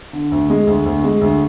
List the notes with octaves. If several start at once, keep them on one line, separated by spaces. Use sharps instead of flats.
D3
D2
G#3
D2
D2
G#3
D2